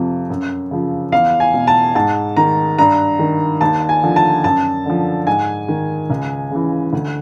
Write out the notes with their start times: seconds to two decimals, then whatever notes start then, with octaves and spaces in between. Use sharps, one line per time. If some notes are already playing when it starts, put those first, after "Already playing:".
Already playing: F2 C3 F3
0.30 F#2
0.71 C#3 F3
1.12 E2 F5
1.40 G#5
1.53 B2
1.67 A5
1.95 G#2 A5
2.37 D#3 A#5
2.79 G2 A#5
3.19 D#3
3.61 D#2 A5
3.89 G#5
4.03 D3 F3
4.16 A5
4.44 F#2 A5
4.86 D3 F3
5.27 G#2 G#5
5.68 D#3
6.10 C#2
6.51 C#3 E3
6.93 D2